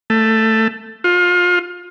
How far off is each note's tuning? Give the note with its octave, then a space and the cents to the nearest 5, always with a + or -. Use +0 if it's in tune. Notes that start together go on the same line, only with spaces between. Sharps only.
A3 +10
F4 +30